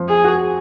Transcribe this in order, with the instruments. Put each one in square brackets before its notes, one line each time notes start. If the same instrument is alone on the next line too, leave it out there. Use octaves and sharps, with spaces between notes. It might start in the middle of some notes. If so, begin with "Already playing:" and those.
Already playing: [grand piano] F3 C4
[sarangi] G#4
[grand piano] F#4